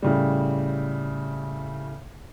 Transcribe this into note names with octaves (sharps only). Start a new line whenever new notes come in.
A2 C#3 G3